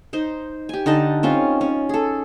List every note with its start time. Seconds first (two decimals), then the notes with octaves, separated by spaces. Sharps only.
0.13 D#4 C5
0.69 G4 G#5
0.86 D3 D#4 D#5 A5
1.23 C4 C#4 F4
1.61 C#4
1.89 G#4 A4